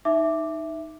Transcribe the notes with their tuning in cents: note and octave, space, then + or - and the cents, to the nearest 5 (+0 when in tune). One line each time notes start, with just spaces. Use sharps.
D#4 +0 E5 +0 D6 +0